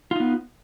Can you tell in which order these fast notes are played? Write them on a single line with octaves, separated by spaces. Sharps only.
F4 D#4 B3